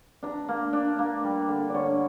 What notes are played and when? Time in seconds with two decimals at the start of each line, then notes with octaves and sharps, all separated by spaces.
0.23 D4 A#5
0.49 A#3
0.73 D4
0.99 A#3
1.24 G3
1.48 D3
1.70 D3 C#5 D5